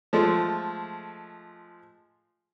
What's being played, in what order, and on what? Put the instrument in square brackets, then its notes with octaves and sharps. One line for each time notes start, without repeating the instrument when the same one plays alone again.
[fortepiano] F3 G#3 A3